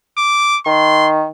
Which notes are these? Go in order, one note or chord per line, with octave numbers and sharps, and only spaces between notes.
D6
D#3 C6